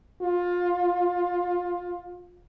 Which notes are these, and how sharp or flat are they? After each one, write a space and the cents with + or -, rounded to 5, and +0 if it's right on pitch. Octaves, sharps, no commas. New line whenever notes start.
F4 +20